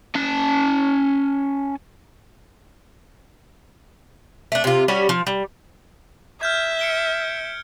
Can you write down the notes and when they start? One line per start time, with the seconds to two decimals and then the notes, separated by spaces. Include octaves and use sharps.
0.15 C#4 A5
4.52 A3 D4
4.64 C3 F4
4.88 G3 C#4 F#4 C#5
5.09 F3
5.27 G3
6.41 E5 F6 G6 G#6
6.79 C#7 D7 G7